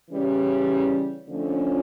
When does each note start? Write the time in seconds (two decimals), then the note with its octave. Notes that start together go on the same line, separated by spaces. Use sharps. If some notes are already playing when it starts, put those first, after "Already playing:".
0.11 C#3 E3 G3 C#4
1.28 F2 D3 F3 A3 C#4